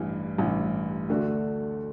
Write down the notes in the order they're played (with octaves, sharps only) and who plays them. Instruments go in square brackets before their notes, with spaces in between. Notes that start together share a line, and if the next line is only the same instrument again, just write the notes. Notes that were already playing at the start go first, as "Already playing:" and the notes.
Already playing: [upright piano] A1 G2 E3
A1 G2 E3
D2 D3 A3 D4 F#4